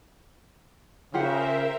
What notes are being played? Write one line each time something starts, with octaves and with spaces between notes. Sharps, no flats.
C#3 F4 G4 A#4 C5 E5 F#5